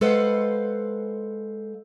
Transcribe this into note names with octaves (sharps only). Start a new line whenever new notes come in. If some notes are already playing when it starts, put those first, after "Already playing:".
G#3 A4 B4 C5 F5 F#5